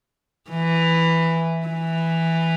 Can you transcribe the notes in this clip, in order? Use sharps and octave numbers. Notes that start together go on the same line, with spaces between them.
E3
E3